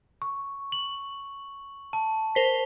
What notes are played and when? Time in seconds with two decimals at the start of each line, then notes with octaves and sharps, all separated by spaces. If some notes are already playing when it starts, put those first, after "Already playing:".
0.22 C#6
0.72 F#7
1.93 A5
2.35 A#4 C5 B6